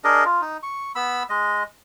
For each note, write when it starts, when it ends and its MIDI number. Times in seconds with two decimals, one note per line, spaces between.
0.04 0.24 62
0.04 0.24 68
0.04 0.24 70
0.04 0.24 75
0.25 0.41 65
0.41 0.57 63
0.63 0.92 85
0.95 1.23 59
0.95 1.23 83
0.95 1.23 88
1.29 1.63 56
1.29 1.63 75